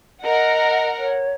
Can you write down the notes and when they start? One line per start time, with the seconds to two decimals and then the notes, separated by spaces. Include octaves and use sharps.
0.23 A#4 D#5 F#5
0.98 C#5